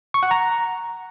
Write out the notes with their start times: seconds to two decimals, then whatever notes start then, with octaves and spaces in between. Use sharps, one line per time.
0.14 C#6
0.23 F#5
0.31 A#5